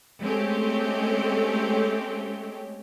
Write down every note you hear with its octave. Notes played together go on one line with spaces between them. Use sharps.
G#3 A3 C4 C#4 G4